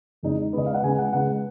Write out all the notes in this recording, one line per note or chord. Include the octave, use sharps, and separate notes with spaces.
F2 C#3 G#3 D#4
C#3 G#3 B3 D#5
F5
F#5
C#3 G#3 B3 G#5
F#5
C#3 G#3 B3 F#5